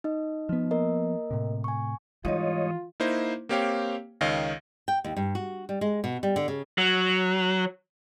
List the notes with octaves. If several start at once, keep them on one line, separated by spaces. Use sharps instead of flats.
D#4 D#5
F3 B3
A#3 A#4 D#5
A2 C3
G#5 C#6
G#2 E3 G3 D#4 F4 C#5 D#5
A#3 D#4 E4 C5
A#3 C4 G4 C#5 F5 G5
C#2 D#3 C#5 D#5 F5 A#6
G5
D#2
G2
F#4
G3
G#3
B2
G3
D3
C#3
F#3